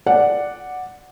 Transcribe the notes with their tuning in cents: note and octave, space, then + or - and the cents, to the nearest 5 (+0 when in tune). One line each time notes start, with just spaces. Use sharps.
D5 +0 F#5 -5